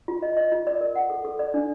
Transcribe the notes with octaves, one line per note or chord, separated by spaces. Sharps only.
F4
D#5
D#5
F4
D5
A#4
F#5
A4
A4
D5
D4